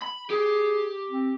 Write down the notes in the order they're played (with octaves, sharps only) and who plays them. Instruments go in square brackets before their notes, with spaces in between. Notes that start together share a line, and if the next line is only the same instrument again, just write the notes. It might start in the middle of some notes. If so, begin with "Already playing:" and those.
[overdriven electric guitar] B5
[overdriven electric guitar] G4 [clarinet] G#4
[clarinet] C4